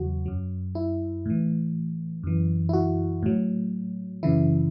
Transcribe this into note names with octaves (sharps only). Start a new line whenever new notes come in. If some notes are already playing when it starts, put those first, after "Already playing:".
Already playing: E2 C#3 F#3 F#4
F#2 F#3
E4
A2 E3
F#2 E3
E4
F#4
A2 F#3
F#2 C#3 E3 E4